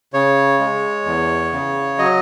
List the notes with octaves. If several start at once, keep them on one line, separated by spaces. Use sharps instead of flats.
C#3 C#5
G#3
E2
C#3
F#3 D#5